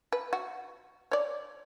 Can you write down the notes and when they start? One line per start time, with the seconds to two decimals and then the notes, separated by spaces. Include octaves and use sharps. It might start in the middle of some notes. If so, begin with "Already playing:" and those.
0.12 B4
0.33 F#4
1.11 C#5 D5